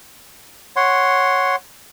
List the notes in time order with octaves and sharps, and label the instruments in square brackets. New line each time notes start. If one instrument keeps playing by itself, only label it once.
[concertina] C#5 F#5 C6